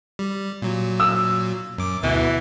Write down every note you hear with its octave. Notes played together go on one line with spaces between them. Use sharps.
G3
A#2 F#3
E6
F#2 D6
D2 B2 E3